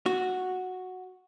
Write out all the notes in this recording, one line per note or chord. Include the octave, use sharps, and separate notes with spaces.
F#4